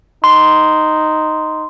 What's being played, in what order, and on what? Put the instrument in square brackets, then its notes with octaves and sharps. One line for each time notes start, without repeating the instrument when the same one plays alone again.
[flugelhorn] D#4 [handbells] C6